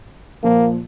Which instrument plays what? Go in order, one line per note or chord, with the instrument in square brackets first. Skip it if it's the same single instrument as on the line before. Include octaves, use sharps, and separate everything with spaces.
[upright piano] A#2 F3 [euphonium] A#3